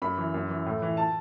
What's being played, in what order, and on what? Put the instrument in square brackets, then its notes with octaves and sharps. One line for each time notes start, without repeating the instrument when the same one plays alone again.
[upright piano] F#2 B5
E3
F#2
E3
A2
E3
A5